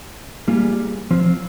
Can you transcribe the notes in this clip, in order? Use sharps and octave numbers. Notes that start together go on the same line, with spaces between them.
G3 A#3 F4 G#4
F3 C4 F4 C5